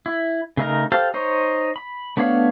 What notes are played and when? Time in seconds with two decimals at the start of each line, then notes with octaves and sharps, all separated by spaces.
0.06 E4
0.57 C#3 A3 D#4 A#4
0.92 G4 A4 C5 F5 A5
1.14 D#4 C5 C#5
1.76 B5
2.17 A3 B3 D4 C#5 F5